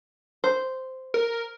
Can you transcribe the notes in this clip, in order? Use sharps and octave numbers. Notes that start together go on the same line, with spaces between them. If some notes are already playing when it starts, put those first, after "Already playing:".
C5
A#4